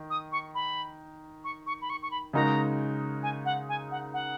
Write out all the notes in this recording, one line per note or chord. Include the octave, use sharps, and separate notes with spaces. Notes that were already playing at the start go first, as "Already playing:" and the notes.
Already playing: D#3
D#6
C#6
B5
C#6
C#6
B5
C#6
C#6
B5
C#3 G#3 D#4 F#4 A#4 A#5
G#5
F#5
G#5
F#5
F#5